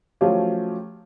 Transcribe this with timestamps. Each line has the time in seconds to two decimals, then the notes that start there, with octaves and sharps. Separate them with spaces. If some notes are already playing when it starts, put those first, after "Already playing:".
0.21 F3 F#3 A3 C#4 F4 G4